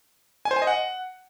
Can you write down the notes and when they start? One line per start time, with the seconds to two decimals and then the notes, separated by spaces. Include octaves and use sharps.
0.45 G#5
0.51 C5
0.56 G#5
0.62 D#5
0.67 F#5